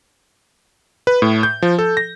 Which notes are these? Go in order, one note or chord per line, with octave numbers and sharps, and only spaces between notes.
B4
A2
G6
F3
A4
A#6